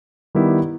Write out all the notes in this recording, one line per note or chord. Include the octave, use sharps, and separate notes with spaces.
D#3 G3 B3 E4 G4